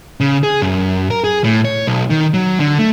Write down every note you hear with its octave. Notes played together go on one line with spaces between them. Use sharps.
C#3
G#4
F#2
A#4
G#4
A2
C#5
B1
D#3
F#3
D3
A3